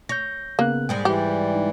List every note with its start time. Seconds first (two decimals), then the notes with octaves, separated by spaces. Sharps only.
0.09 C#5 G6 A#6
0.59 C#3 A#3 B3 F#6
0.89 G#2 G3 G#3 G5
1.05 E3 G4
1.55 D#4